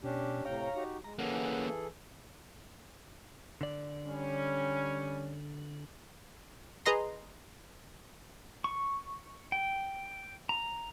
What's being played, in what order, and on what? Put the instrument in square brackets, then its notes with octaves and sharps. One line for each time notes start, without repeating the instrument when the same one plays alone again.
[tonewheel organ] B2 [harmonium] C#4 D4 G4
[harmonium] A2 C3 G5 [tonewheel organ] C#5 F5 A#5
[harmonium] D#4 F#4 G4
[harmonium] G#3 [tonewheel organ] A#5
[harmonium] E3 G#4 A4 [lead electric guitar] A#3 C#4 [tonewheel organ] F#5
[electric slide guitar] D3 D5
[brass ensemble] G3 C#4
[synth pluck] G#4 B4 D#5 A#5 C6
[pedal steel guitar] C#6
G5
A#5